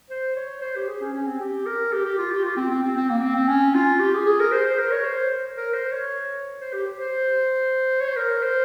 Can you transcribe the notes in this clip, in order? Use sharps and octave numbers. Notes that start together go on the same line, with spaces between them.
C5
C#5
C5
G4
G#4
C#4
C#4
C4
G4
A#4
G4
G4
F4
G4
F4
C4
C4
C4
C4
A#3
C4
C4
C#4
F4
G4
G#4
G#4
A#4
C5
C5
A#4
C#5
C5
A#4
C5
C#5
C5
G4
C5
C#5
C5
A#4
C5